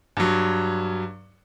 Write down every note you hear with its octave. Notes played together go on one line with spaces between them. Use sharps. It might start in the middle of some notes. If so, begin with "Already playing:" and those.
G2 F#3